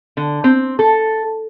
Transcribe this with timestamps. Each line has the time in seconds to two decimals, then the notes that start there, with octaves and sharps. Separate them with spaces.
0.17 D3
0.44 C4
0.79 A4